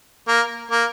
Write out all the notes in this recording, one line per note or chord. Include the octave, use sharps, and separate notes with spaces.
A#3
A#3